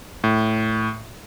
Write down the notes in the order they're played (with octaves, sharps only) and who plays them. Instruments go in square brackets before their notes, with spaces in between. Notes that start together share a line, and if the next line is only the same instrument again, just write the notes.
[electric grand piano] A2